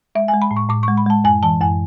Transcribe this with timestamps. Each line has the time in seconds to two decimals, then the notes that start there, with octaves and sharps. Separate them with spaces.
0.15 G#3 E5
0.28 G#5
0.34 G#3
0.42 B5
0.51 A2
0.56 C#6
0.69 A2 D6
0.83 G#3 C#6
0.97 B5
1.06 G#3 A5
1.24 F#2 G#5
1.43 E3 A5
1.61 F#2 G#5